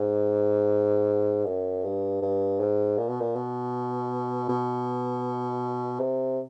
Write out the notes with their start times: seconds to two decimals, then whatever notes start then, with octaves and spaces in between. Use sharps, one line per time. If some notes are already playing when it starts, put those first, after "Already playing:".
Already playing: G#2
1.46 F#2
1.84 G2
2.22 G2
2.60 G#2
2.98 A#2
3.09 B2
3.20 A#2
3.35 B2
4.49 B2
6.00 C3